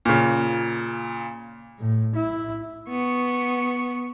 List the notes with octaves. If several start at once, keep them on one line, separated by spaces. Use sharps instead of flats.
A#2 C#3
A2
E4
B3 C#6